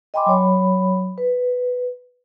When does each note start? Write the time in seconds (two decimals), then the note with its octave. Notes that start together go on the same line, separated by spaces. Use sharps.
0.14 D#5 G5 G#5 B5 C6 D6
0.26 F#3 C#5 B5
1.18 B4